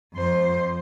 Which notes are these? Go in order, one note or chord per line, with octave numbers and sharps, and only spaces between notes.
F2 C5